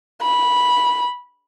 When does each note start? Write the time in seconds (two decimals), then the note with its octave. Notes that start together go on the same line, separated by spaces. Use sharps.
0.22 B5